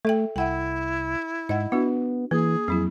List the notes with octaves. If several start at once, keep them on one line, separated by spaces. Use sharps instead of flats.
A3 A4 E5 G5
C2 E4 E5 F#5 G5
G#2 D#5 F#5
B3 D4 F#4
E3 A#3 G#4
F2 F#3 C4 E4